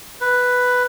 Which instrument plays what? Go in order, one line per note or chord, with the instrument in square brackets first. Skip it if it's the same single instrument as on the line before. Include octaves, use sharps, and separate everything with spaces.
[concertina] B4